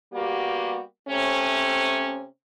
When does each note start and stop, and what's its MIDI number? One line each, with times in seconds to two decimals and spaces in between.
0.13 0.80 55
0.13 0.80 58
0.13 0.80 59
0.13 0.80 66
0.13 0.80 67
1.09 2.24 48
1.09 2.24 57
1.09 2.24 60
1.09 2.24 61